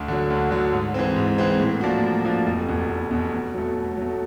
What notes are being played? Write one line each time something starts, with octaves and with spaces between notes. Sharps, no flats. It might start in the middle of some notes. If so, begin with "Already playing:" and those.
Already playing: D2
D3 F#3
D2
D3 F#3
G#2
E3 G#3 C4
G#2
E3 G#3 C4
A2
F3 A#3 D4 F#4
A2
F3 A#3 D4 F#4
F1
E2 B2
F1
E2 B2
B2
F#3 A3
B2
F#3 A3